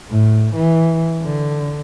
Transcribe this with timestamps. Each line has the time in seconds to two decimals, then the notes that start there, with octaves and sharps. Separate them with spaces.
0.10 A2
0.56 E3
1.22 D3